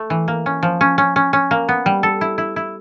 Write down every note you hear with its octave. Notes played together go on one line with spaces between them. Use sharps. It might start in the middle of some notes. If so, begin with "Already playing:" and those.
Already playing: A3
E3
A#3
C#4
F3
C#4
C#4
C#4
C#4
A#3
B3
G3
A4
E4
E4
E4